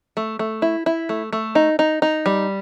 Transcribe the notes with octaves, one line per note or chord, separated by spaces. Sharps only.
A3
A3
E4
E4
A3
A3
D#4
D#4
D#4
G3